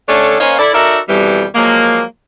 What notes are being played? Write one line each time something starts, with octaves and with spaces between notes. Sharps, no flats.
D3 A3 C#4 D4 A4 C#5
A#3 C#4 C5 C#5 D#5 F5
E4 A4 D5
D#4 F#4 A4 A#4 D5 E5
F2 B2 E3 G3
F3 F#3 G#3 A#3